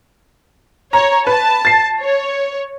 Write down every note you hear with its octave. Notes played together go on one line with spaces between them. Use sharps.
C#5 A#5
B4 A5
A6 C7
C#5